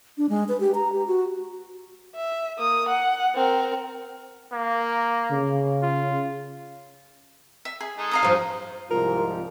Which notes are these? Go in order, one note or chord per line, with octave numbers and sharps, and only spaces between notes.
D4
G#3
B4
G4
A#5
G4
F#4
E5
A#3 D#6
F#5
C4 A#4
A#3
C#3
F4
E5
G#4
G#3 D#4 A4
F5 A#5 D#6
G2 F3
C2 G#2 F3 F4 A#4